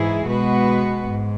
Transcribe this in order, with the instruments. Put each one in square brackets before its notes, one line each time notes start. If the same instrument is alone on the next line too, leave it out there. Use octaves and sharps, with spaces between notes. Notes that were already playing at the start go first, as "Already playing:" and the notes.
Already playing: [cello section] G#2 E3 E4 G#4
B2 G#3 B3 F#4 B4
G#2